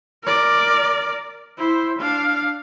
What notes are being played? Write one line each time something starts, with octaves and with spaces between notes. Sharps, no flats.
A#4 D5
E4 C5
D4 F5